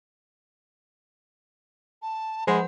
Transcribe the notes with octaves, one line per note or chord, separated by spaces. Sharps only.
A5
F3 G#3 C5 F#5 B5